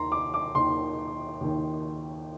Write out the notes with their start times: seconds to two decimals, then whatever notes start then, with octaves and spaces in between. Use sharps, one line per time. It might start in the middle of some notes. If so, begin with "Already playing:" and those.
Already playing: D#2 D#3 A#5 C6
0.12 D6
0.34 D6
0.55 D#2 D#3 C6
1.41 D#2 D#3